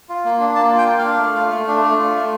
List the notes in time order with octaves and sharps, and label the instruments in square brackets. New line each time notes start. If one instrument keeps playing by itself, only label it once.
[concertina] F4
A#3
D4
A#3 A5
F4
G5
A#3
F5
D4
A3
F4
A3
D4
A3
F4
A3